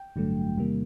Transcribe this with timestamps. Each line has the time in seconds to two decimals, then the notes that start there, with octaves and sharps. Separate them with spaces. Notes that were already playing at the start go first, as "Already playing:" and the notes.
Already playing: G5
0.16 A1 G2 D3 F#3 A3
0.57 E2 C3 D#3 G3 A#3